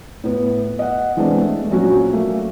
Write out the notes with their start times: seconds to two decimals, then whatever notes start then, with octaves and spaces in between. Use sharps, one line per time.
0.24 A2 B3
0.79 D#5 F#5
1.17 E3 G#3 B3 C4 D4
1.41 A3
1.71 A#1 F#3 C#4 F#4
2.13 A3 A#3